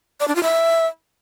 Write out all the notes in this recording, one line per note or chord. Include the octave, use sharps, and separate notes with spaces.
D5
D4
F4
E5